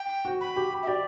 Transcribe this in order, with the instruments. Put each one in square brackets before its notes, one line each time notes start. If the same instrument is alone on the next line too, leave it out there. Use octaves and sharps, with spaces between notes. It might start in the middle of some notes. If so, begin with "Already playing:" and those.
Already playing: [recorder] G5
[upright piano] F#4
[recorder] B5
[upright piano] G4
[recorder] E5
[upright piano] G4 [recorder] D5